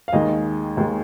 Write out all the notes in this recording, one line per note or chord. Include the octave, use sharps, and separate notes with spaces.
F5
D#2 D#3 G#3 D#5
D#2 D#3 G#3